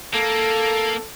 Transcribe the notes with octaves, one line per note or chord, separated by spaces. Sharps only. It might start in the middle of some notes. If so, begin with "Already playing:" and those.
A#3 A4